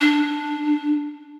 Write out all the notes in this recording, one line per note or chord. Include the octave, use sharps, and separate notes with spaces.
D4